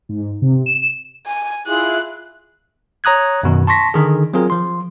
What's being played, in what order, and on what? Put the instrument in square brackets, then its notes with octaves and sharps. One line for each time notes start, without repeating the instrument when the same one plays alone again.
[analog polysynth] G#2
C3
E7
[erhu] G#5
[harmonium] E4 F4 G#4 [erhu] F#6
[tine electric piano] C#5 A#5 D#6 F#6 G#6
F#2 B2 D#3
A5 C6 C#6 A#6 B6
D3 D#3 G#4
F#3 C4 F4 G#4 A#4
F3 C6